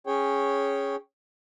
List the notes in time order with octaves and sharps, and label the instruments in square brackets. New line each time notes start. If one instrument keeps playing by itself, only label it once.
[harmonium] C#4 G#4 C#5 G5